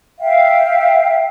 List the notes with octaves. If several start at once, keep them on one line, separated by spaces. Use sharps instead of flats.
E5 F5 G5